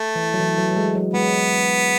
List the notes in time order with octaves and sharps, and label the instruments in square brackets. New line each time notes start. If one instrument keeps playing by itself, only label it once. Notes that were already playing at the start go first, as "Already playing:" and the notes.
Already playing: [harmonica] A3
[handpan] E3
F#3
E3
F#3
F#3
G#3
F#3
[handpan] G#3 [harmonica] B3